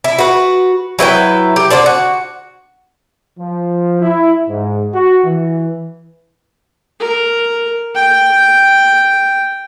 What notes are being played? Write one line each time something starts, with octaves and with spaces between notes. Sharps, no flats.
E4
F#4 B4
F#3 E4 B4 G5
G4
D3 C5 D5 A5
F#4
F3
E4
G#2
F#4
E3
A#4
G5